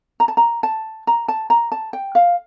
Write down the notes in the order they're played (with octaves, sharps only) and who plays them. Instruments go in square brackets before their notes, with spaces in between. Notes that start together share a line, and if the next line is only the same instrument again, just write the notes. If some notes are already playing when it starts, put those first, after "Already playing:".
[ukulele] A#5
A5
A#5
A5
A#5
A5
A#5
A5
G5
F5